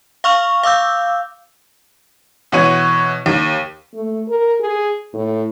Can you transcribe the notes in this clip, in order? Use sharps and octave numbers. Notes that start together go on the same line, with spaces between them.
F5 C#6 F6 F7
F5 D6 E6 G6
B2 E3 F#4 C#5 D#7
D#2
A3
A#4
G#4
A2